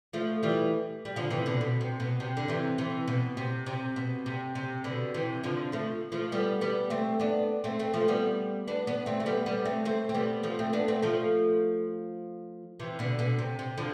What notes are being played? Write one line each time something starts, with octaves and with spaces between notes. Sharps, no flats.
F3 A3
E3 G3
G3
D3 F3
C3 E3
B2 D3
B2
C3
B2
C3
D3
C3 E3
C3 E3
B2
C3
C3
B2
C3
C3
B2 D3
C3 E3
D3 F3
F3 A3
F3 A3
G3 B3
G3 B3
A3 C4
B3 D4
A3 C4
A3 C4
F3 A3
G3 B3
B3 D4
B3 D4
A3 C4
A3
G3 B3
G3 B3
A3 C4
A3 C4
C4
G3 B3
F3 A3
A3 C4
B3 D4
A3 C4
F3 A3
C3 E3
B2 D3
B2 D3
C3
C3
D3 F3